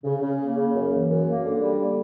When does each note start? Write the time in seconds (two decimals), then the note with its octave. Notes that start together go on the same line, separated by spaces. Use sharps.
0.04 C#3
0.22 C#3
0.39 A#3
0.57 C#3
0.73 F#2
0.91 E3
1.08 F#2
1.26 A#3
1.44 D3
1.61 G3
1.78 A#3